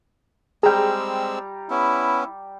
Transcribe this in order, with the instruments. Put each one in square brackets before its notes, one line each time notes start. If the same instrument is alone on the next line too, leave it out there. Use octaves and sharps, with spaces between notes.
[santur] G3 A#5 [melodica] G#3 C4 E6 [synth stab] G#4 G5
[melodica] B3 C#4 [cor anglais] E4